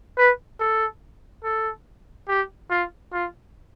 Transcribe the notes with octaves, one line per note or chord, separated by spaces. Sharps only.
B4
A4
A4
G4
F4
F4